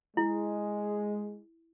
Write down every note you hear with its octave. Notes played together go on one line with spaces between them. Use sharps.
G#3 E4